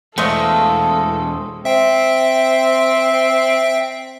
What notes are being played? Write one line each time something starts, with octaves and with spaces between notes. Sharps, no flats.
E2 G#3 A3 A4 C5 D#5 F5
C4 E5 G5